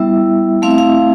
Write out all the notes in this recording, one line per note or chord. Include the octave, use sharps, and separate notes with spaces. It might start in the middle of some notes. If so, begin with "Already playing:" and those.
Already playing: G3 B3 E4 E5
A3 C4 E4 F5
E5
F5